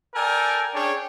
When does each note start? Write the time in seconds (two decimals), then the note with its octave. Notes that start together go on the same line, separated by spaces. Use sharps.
0.15 A4 A#4 D5 G5 G#5
0.75 C#4 D4 G#4 C#5 G5